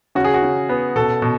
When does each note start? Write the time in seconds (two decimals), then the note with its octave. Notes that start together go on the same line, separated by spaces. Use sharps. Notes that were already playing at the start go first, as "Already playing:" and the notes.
0.15 C#3 F#4
0.24 G#4
0.34 F#4
0.42 C#3
0.69 B3
0.96 B2 A4
1.22 B2